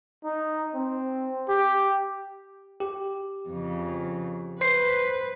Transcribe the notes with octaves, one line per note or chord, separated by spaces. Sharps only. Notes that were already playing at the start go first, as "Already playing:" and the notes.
D#4
C4
G4
G4
F2 C#3
B4 C5 C7